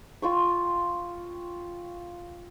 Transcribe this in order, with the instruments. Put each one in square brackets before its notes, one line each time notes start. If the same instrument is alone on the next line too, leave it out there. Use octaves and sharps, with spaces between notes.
[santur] F4 G5 C#6